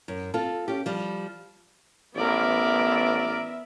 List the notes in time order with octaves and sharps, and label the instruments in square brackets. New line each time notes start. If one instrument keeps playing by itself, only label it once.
[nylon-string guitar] F#2
C4 F4 A4
C#4 G4
F3 G3
[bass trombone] A1 [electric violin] B3 E5 [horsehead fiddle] A#4 D5